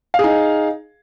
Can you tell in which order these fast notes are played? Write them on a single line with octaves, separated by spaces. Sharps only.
F5 G#4 D#4